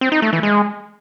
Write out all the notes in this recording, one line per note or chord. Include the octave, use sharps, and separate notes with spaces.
C4
D#4
A3
E3
G#3